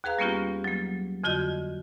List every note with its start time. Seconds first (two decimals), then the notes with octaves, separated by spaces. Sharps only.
0.04 D#2 G#4 B4 F5 A#5
0.19 G3 A#3 B3 C#4 F4 G4
0.64 F#3 A#3
1.24 F2 D3 F4 F#4 D#5 G6